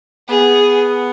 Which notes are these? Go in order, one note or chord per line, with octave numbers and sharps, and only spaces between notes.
B3 G#4